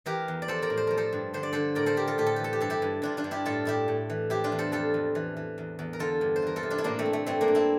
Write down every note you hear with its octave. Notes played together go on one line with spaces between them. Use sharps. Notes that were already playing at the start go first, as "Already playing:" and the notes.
E3 G4 A#4
E2
D5
F3 A4 C5
A#4 D5
A2
C5
F3 A#4
A4 C5
G2
D3 C5
D5
D3 A4 C5
A2 A#4 D5
A4 C5
A2 G4 A#4
F4 A4
A2 G4
A4
E3 G4
A4
G4
G2 A4
E4 G4
G2
G2 D4 F4
D4 F4
G2
E4 G4
A2 F4 A4
A2 E4 G4
A2
E3
F3 E4 G4
D4 F4
E2
A4 C5
F2 F4 A4
F2
E3
E3
E2
E2
A#4
D3 F4 A4
G2
C5
E3 A#4
F4 A4
C3
D4 F4
E4
A2 A#3 D4
A3 C4
A2
A3
G2 A3 C4
A#3 D4
G2
C4 E4